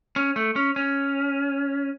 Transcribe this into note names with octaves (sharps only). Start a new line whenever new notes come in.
C#4
A3
C#4
C#4